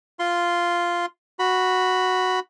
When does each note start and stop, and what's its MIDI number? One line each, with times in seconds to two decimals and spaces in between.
0.19 1.06 65
0.19 1.06 84
1.39 2.40 66
1.39 2.40 83